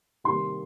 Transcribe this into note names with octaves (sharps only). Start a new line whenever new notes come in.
C3 D#3 G3 A#3 C6